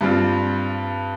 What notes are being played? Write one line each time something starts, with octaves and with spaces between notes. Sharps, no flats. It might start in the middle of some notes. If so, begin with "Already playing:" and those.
G2 G3 C4 F4